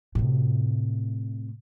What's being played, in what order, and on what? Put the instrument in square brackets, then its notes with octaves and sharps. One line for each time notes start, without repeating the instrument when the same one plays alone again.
[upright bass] A2 C3